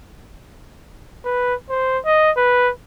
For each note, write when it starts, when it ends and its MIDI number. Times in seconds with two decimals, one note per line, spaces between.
1.25 1.55 71
1.70 1.99 72
2.05 2.31 75
2.37 2.70 71